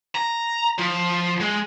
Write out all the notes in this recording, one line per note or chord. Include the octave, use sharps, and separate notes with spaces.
A#5
F3
G#3